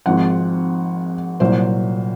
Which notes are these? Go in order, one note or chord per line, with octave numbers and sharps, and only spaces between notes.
G#1 G#2 F3 C4 F#5
C2 A#2 F#3 C5